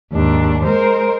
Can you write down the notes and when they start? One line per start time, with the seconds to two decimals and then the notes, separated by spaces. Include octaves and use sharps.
0.12 D#2 G#2 D4
0.64 G#3 A#4 C5